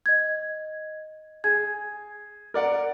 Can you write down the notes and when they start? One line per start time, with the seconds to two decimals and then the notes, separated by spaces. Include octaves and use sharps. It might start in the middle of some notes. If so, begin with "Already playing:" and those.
0.06 D#5 G#6
1.44 G#4 G#6
2.54 A#4 D5 F#5